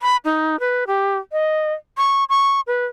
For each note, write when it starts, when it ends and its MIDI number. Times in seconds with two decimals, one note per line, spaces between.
0.02 0.17 83
0.25 0.59 63
0.60 0.84 71
0.87 1.18 67
1.32 1.74 75
1.97 2.24 85
2.29 2.61 85
2.67 2.85 71